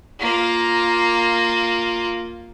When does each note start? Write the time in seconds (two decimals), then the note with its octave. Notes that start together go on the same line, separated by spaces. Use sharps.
0.20 A#3 F4